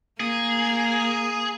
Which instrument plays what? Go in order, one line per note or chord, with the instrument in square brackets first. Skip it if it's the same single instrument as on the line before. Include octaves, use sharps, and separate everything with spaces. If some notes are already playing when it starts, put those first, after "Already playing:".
[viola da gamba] A#3 [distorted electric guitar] G#4